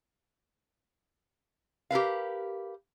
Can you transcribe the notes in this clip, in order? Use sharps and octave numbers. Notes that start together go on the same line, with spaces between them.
G4 A#4 B4 F5